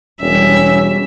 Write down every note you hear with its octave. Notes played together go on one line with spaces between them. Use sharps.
E1 G3 C#4 E5